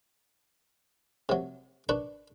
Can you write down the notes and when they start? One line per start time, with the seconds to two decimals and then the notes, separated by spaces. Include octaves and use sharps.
1.29 C3 F#3
1.89 D4 B4 D5 C#6